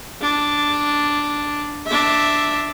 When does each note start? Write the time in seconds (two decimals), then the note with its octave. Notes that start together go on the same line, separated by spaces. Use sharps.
0.22 D4
1.87 D4 E5